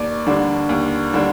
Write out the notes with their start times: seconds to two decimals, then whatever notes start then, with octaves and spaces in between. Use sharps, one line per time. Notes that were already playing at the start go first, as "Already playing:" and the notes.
Already playing: D#2 D5
0.26 D3 G3 D4
0.69 D#2
1.13 D3 G3 D4